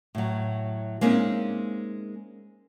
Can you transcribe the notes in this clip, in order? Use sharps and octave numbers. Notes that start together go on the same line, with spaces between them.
A2 F#3
G#3 A#3 C4 C#4 D#4